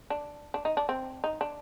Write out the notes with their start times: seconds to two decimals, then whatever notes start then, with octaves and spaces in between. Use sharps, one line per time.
0.10 D4
0.54 D4
0.65 D#4
0.77 D4
0.89 C4
1.24 D#4
1.41 D4